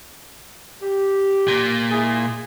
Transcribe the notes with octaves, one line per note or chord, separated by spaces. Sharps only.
G4
A#2
G#3 E4 G#4